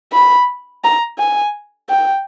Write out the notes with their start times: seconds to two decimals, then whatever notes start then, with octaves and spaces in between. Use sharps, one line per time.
0.13 B5
0.84 A#5
1.19 G#5
1.89 G5